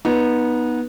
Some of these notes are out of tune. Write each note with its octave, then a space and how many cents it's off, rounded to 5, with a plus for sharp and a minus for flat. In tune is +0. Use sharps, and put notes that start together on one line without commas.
B3 -20 D#4 -5